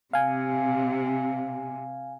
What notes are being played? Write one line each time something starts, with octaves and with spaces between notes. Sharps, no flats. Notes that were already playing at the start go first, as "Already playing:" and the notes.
C3 F5 G#5